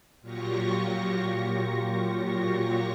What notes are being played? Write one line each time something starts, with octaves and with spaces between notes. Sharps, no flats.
A#2 F#3 F4 G4 C#6 A#6